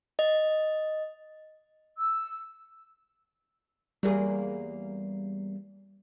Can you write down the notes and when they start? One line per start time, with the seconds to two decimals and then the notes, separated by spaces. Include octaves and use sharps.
0.19 D#5
1.98 E6
4.03 E2 G3 A#3 G#4